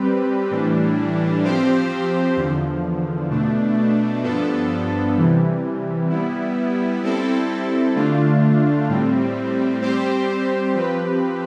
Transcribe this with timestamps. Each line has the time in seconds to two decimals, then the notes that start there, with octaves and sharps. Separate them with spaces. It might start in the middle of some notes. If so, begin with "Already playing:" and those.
Already playing: G3 C4 G4 B4
0.50 A2 E3 G3 D4
1.43 F3 C4 G4 C5
2.37 E2 D3 F3
3.30 B2 A3 D4
4.22 G2 F3 B3 D4 A4
5.16 C3 E3 G3
6.09 G3 B3 E4
7.03 G3 C4 E4 A4
7.95 D3 A3 D4 F4
8.89 A2 G3 C4
9.82 G3 C4 G4 C5
10.75 F3 C4 G4 B4